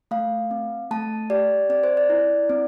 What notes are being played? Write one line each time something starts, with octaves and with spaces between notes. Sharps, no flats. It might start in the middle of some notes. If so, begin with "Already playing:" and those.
A3 F5
C4
A3 A5
G4 D5
C4 D5
C5
D5
E4
C4